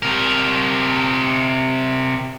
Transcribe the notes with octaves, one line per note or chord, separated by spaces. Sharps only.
C3 A#4